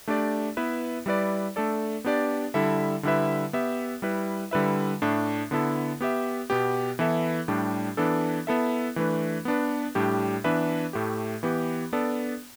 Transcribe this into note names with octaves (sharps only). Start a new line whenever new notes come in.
A3 D4 G4 D5
B3 E4 B4 E5
G3 E4 B4 D5
A3 D4 A4 D5
B3 D4 G4 D5
D3 G3 E4 A4 E5
D3 G3 E4 B4 E5
B3 G4 E5
G3 E4 B4
D3 G3 E4 B4 E5
A2 A3 D4
D3 B3 E4 A4
B3 G4 E5
B2 B3 G4
E3 B3 E4 A4 E5
A2 G3 D4 G4
E3 B3 D4 A4
B3 E4 A4 E5
E3 A3 D4 B4
B3 D4 B4
A2 G3 D4 G4
E3 B3 D4 B4 E5
A2 A3 G4
E3 B3 G4
B3 D4 A4 D5